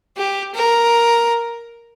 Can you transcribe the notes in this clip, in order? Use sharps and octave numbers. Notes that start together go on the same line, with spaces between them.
G4
A#4